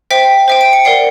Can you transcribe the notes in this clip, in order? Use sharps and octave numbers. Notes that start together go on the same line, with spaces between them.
C5 E5 G5 B6
C5 E5 G5
D7
C#7
A#4 D5 F#5 C7